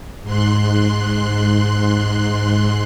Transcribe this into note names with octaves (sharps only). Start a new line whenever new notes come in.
G#2 C6 F#6